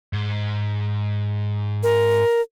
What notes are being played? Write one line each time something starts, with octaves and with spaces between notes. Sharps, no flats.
G#2
A#4